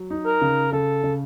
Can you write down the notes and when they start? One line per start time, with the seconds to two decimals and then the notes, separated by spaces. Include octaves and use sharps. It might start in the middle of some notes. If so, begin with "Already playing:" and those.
Already playing: F#3
0.10 D#4
0.26 A#4
0.41 C#3
0.72 C#3 A4
1.03 C#3